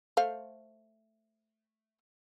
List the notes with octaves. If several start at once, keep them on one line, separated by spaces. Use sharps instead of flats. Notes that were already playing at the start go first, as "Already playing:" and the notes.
A3 C5 F5